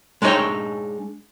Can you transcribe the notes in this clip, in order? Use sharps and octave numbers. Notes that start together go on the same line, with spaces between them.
G#3 D4 D#4 F#4 C#5 G5